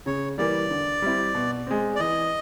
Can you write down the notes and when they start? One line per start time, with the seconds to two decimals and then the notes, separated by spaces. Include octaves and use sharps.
0.06 C#3 C#5
0.38 E3 G3 A#3 D5
0.71 D3
1.02 G3 C4 E4
1.34 B2
1.67 G#3 C4
1.96 D5
1.99 E3 D#5